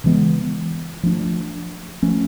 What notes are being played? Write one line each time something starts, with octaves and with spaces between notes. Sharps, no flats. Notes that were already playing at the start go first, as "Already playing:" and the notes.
C#3 E3 G#3 B3
F3 A3 D4
F3 A3 C#4